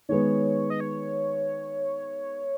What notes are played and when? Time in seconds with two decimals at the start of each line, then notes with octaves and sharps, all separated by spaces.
0.09 D#3 G#3 B3 C#5
0.70 D#5
0.80 C#5